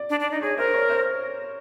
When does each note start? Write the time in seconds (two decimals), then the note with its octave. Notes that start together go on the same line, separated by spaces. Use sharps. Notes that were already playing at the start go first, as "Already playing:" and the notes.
Already playing: D5
0.10 D4
0.20 D4
0.31 D#4
0.42 G#4 C#5
0.58 A#4 C5
0.73 C#5
0.89 C5